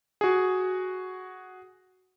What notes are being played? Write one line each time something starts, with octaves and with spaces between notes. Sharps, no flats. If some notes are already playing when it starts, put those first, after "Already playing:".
F#4 G#4